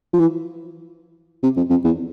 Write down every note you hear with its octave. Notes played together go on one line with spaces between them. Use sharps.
F3
E3
C3
F2
F2
E2